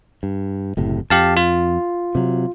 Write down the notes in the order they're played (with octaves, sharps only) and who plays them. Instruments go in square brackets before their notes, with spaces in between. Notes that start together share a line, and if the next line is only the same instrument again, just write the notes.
[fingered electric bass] G2
F#1 A2 C3
[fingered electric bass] F2 [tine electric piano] G4 F5 A5
[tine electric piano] F4
[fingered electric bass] C3 F#3